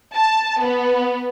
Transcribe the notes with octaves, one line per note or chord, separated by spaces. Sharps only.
A5
B3